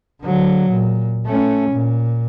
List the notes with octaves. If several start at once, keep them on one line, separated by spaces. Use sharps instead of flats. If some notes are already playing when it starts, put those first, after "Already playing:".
D3 F#3
A#2
A3 C#4
A#2